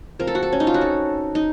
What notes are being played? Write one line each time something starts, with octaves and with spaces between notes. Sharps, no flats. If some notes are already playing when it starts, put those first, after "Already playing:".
F3 C4 A#4
A4
F#4
A4
C#4
D#4
F4
F#4
A4
D#4